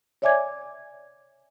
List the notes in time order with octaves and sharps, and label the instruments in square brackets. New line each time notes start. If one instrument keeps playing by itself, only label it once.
[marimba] C#5 D5 E5 G#5 D6 G#6